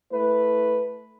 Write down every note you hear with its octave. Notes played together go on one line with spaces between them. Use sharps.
A3 E4 B4